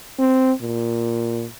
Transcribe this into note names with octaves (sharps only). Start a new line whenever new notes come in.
C4
A#2